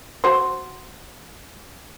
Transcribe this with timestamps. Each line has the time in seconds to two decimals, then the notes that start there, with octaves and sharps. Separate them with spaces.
0.24 F#4 C5